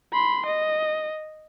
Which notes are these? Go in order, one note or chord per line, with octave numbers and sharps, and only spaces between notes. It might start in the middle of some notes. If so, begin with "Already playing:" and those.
B5 C6
D#5